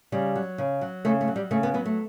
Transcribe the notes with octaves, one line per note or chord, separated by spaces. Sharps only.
C#3 G3
F#3
C#3
F#3
C#3 A3
A3
F#3
G3
C#3 A3
B3
F#3 B3
A3